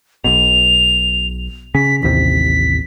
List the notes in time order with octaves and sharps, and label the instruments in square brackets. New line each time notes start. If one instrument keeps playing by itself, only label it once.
[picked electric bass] B1 B2 [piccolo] F7
[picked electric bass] C#3 C#4 [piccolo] B6
[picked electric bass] A1 D#2 C3 [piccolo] B6